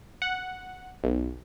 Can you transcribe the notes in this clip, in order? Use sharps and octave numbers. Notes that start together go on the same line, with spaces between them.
F#5
B1